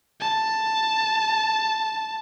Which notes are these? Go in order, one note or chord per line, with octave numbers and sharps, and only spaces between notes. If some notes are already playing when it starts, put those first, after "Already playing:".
A5